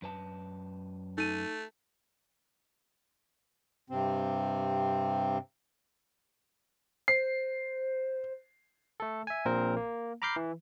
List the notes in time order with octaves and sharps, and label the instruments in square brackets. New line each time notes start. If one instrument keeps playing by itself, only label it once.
[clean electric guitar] F#2 B4 A5
[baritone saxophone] A3 [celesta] D#4 D#7
[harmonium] G2 C3 C4
[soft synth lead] C5 [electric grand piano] C7
[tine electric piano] A3 A4
E5 G#5
A#1 A#2 C4 A#4 C5
A#3
A#5 B5 D6 F6 G6 C7
E3